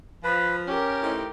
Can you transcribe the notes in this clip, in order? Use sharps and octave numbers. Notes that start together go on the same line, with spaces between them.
F3 B4
C#4 G4 A#4
A2 C4 D#4